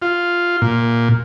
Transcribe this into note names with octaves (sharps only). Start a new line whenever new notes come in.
F4
A#2